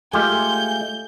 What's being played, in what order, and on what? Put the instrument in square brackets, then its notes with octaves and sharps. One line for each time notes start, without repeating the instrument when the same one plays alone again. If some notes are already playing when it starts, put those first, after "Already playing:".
[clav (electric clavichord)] G#3 F4 G4 [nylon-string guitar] A3 [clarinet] G#5 [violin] G6